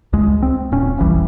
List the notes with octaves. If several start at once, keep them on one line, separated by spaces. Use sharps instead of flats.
C#2 G#3
C4
D1 A#2 C#4
E1 A#1 E3 G3